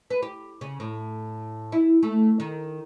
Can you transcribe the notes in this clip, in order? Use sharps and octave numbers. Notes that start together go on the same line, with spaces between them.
B4
G4
C#3
A2
E4
A3
D#3